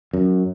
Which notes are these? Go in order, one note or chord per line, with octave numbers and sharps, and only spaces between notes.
F#2